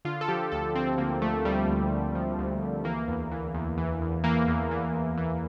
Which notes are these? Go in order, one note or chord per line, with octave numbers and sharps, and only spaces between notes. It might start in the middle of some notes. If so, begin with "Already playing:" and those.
D3 F4
A4
F3 G4
D2 A4
D2 C4
D3 A#3
F3 A3
D2 G3
D2
D3
F3
D2
D2
E3 A#3
E2
E3
E2
E3
E2
E3 A#3
E2
E3
E2
E3